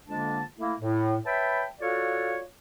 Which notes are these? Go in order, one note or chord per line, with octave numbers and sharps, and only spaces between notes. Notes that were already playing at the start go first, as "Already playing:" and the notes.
F2 D3 G#3 A#3 D4 A5
A3 A#3 E4
A2
B4 C#5 E5 G5 A5 B5
F4 F#4 A4 C#5 D5 F5